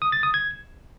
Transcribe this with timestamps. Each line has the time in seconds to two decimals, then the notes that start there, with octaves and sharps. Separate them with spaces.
0.02 D#6
0.12 A6
0.23 D#6
0.34 G#6